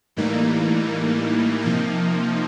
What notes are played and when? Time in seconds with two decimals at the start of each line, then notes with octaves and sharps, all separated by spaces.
0.16 A2 E3 G3 A#3 D#4
1.62 C3 F3 A#3 D#4